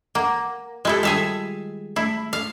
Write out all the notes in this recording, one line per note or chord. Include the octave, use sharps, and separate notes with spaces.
A#3 F#5
G#3 E4 F4 G4 A4
D#3 G3 G#4 E5 F5
A3 E4
F5